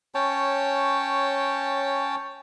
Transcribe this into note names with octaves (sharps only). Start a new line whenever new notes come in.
C#4 C#5 G5 A5